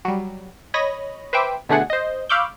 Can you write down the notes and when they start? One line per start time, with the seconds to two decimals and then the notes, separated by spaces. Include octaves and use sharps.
0.05 F#3 G3
0.74 C#5 D#5 B5 A#6
1.33 B4 C5 E5 G5 D6
1.69 B2 D3 A3 D4 G#4 F#5
1.90 C5 D#5
2.29 F5 B5 C#6 D6 E6 G6